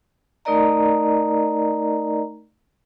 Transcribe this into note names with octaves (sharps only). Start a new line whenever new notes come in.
A3 D#4 A#4 D5 D#5 A#5